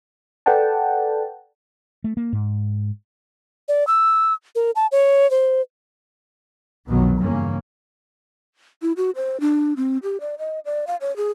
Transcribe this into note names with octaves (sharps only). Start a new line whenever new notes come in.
A4 B4 D5 F#5 G5 A5
A3
A#3
G#2
D5
E6
A#4
A5
C#5
C5
F1 B1 B2 D#3 F#3 B3
E2 G2 C#3 A#3 C#4
E4
F#4
C5
D4
C4
G4
D5
D#5
D5
F5
C#5
G#4